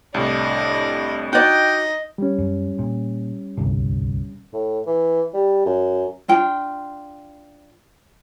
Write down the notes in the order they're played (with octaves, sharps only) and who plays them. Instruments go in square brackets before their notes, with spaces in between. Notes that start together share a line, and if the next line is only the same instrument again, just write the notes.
[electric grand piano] C2 A2 [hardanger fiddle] D4 D#5
[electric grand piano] D#4 [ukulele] F#4 D5 [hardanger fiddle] D#5 [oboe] G5
[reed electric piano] G3 C#4
[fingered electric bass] F#2
A#2
D1 G1 C2
[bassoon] A2
E3
G3
F#2
[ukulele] D4 F4 G5